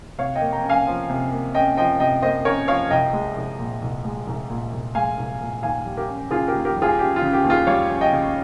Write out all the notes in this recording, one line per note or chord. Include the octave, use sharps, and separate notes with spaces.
C3 C#5 F5
D#5 G5
A#3
G5 A#5
C#4
F5 G#5
F3
C3
A#3
C#4 D#5 G5
F3 D#5 G5
C3 D#5 G5
A#3 C5 D#5
C#4 A#4 C#5
F3 C#5 F5
C2 D#5 G5
G#3
C2
A#2
C2
G#3
C2
A#2
C2
G#3 F5 G#5
C2
A#2
D#2 F5 G#5
G3
G4 A#4
C#4
C#3 F4 G#4
G4 A#4
D#2
G4 A#4
G3
F4 G#4
C#4 G4
F4
C#3
G4
D#2
F4 G#4
G3 C#5 F5
C#4
D#5 G5
C#3